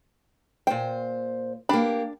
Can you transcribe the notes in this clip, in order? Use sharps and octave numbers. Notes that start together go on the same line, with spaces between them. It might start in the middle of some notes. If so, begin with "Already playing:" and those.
A#2 C5 G5
A#3 D4 G4 B5